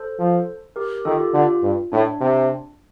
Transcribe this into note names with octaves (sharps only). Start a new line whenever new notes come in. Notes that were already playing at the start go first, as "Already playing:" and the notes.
Already playing: A4 C5
F3
G4 A#4
D#3 F4 A4
G4
D3 F4
G2
A2 D4
C3